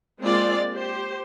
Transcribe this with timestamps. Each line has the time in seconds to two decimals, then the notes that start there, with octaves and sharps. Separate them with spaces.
0.21 G#3 A#3 C4 F4 D5
0.74 G4 C5